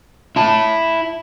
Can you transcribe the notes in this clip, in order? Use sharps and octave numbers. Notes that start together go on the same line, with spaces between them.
E4 A5